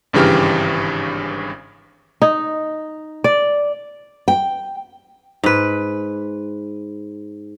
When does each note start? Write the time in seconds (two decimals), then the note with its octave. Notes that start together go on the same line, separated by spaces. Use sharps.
0.13 G#1 G2 C#3 E3 G4 F6
2.22 D#4
3.24 D5
4.28 G5
5.44 G#2 B4